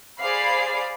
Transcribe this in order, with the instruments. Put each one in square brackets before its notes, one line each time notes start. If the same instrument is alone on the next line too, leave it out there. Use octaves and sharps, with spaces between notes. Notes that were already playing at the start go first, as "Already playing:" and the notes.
[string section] G#4 C5 D5 F5 B5 C7